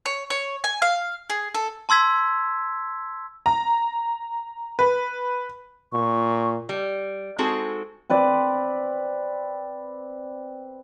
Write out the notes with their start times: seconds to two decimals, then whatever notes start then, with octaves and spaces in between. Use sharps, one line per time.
0.06 C#5
0.30 C#5
0.64 G#5
0.82 F5
1.30 G#4
1.54 A4
1.89 A5 C6 E6 G#6 B6
3.46 A#5
4.79 B4
5.93 A#2 C#6
6.69 G3
7.38 G#3 C4 D#4 F#4 G#4 A4
8.10 C4 B4 D5